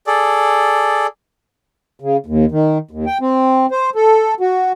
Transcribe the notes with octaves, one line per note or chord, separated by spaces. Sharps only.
G#4 A4 D5
C#3
D#2
D#3
D#2
G5
C4
C5
A4
F#4